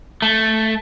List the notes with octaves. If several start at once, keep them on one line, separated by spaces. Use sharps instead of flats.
A3